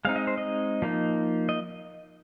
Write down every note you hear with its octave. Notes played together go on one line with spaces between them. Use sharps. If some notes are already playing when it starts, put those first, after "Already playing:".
G#3 C4 D#4 F5
D#5
C5
D#5
F3 A#3 D#4
D#5